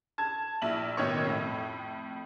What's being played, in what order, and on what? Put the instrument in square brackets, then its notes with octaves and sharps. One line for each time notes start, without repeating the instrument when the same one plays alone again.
[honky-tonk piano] A5 G#6
A#1 E4 F#7
A1 B2 D#3 C#5 C#6
F2 A2